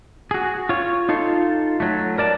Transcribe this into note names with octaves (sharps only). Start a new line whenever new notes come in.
F#4 G#4
F4 C#5
D#4 F4 A4
F#3 A3
A#4 D5 A5